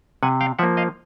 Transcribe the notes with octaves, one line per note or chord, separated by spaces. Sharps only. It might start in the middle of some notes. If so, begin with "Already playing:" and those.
C3 F#5 G#5
F5 G5
F3 A#3 E5 F#5
D#5 F5